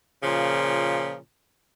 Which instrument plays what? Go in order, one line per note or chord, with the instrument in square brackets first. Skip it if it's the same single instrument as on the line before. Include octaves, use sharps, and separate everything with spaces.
[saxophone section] A#2 C#3 F3